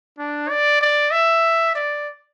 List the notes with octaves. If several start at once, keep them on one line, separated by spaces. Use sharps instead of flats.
D4
D5
D5
E5
D5